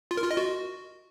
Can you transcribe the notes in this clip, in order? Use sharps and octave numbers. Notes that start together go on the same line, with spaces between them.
F4
A#4
F4
D#5
F#4